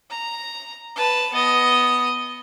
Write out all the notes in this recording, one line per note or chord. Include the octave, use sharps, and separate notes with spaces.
A#5
B4 A5
B3 D#5